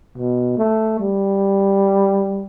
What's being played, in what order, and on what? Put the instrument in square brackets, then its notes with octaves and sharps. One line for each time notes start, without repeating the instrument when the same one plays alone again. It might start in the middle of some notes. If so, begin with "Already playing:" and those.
[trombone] B2
A3
G3